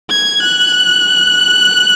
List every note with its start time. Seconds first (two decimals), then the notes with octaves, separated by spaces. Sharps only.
0.09 G#6
0.42 F#6